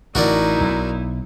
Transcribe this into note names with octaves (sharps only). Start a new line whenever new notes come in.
A1 D#4 E4 F#4 A#4 D5
B1